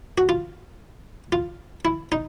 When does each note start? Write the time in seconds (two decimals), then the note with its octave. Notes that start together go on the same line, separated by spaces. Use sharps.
0.18 F#4
0.29 F4
1.32 F4
1.85 E4
2.12 D#4